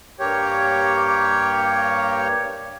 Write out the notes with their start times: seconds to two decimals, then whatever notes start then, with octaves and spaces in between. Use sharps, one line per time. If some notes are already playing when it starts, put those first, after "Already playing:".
0.20 G2 A#3 G4 C#5